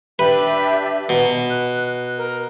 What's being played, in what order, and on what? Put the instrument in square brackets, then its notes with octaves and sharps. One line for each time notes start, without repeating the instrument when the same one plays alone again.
[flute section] D4 G4 E5 [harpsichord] B4
[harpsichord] B2 [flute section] A#5
[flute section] F#6
A#4